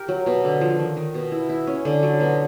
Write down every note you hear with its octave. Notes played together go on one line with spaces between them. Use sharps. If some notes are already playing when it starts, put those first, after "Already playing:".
Already playing: G4 A#4
F#3
B2
D3
F3
D#3
D#3
B2
E4
E4
C#4
D3
F#3
B2